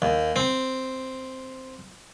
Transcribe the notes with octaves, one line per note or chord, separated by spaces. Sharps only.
D#2
C4